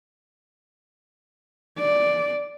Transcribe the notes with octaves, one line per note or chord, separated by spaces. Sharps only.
D5